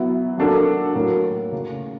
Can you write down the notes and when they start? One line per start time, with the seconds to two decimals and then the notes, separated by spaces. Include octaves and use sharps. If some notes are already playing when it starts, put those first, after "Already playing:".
Already playing: F#3 B3 E4
0.38 F#3 A#3 D4 F#4 A4
0.95 A2 F#3 A#3
1.52 C#3